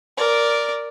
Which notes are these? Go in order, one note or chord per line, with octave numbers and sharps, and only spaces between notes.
A#4 D5